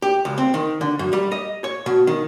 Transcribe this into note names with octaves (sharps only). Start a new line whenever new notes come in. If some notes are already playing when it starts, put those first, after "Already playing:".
G4
C#2
C4
D#3
D3
F#2
G3
D#5
C#5
B2
D#3